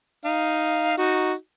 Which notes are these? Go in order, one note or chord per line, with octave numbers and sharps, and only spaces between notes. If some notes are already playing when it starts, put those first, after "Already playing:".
D#4 F5
D#4 F#4